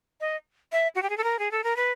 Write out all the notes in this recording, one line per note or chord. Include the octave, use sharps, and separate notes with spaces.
D#5
E5
F#4
G4
G#4
A4
A#4
G#4
A4
A#4
B4